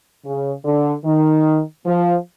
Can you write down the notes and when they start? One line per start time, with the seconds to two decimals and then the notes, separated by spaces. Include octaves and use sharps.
0.24 C#3
0.65 D3
1.05 D#3
1.86 F3